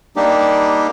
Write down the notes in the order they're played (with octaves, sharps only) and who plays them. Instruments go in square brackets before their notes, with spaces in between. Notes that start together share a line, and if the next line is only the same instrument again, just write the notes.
[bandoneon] G3 A#3 D4 D#4 G4